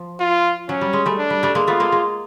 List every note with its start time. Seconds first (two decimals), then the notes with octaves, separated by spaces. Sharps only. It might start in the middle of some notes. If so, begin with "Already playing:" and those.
Already playing: F3
0.20 F4
0.69 F#3 C#4
0.81 G3
0.93 G#3
1.06 G3 A3
1.18 D4
1.30 G3
1.43 G3 A3
1.55 G#3 A#3
1.67 A3 B3 F4
1.80 G#3 A#3
1.92 G#3